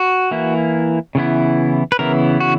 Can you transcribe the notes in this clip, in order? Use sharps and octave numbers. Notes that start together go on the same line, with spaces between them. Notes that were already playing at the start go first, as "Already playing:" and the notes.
Already playing: F#4
E3 A#3 E4
C#3 E3 B3 E4
B4
C#3 E3 B3 E4 A#4
F#4